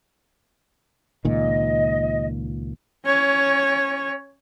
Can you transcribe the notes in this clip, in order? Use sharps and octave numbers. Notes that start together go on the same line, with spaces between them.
C#2 A#2 D#3 D#5
C#4 C#5